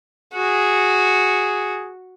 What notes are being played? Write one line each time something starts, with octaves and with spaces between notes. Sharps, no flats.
F#4 G#4